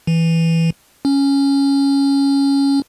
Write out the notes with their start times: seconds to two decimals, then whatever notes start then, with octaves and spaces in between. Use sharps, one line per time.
0.07 E3
1.05 C#4